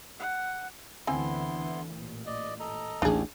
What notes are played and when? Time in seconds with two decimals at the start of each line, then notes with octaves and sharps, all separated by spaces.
0.20 F#5
1.07 D2 D3 E3 B3 C4 E4 G#5 C6
1.91 A1 A#2
2.26 D5 D#5
2.60 A4 D#5 A#5
3.02 A1 D#2 D4 G#4